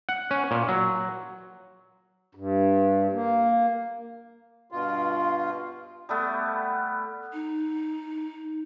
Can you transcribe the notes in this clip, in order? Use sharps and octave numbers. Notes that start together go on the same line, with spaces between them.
F#5
C#4
A#2
F#3
G2
A#3
G2 B2 F4
G3 A3 B3
D#4